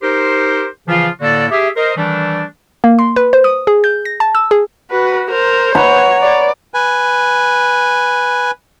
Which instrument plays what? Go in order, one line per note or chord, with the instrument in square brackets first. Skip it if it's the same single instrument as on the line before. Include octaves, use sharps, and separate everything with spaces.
[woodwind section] D#4 G4 A#4 C5
C#3 E3 F3 F4
A2 D3 A#3 F#4 A4 D5
G4 G#4 E5
A#4 C5 D#5
D#3 E3 G3 A3 D4
[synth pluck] A#3
C6
B4
C5
D#6
G#4
G6
A#6
A5
E6
G#4
[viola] F#4 [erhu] B4
[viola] A#4 [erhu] C5
[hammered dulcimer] B4 F#5 A#5 [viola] C#5
[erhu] D5
[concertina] B4 G#5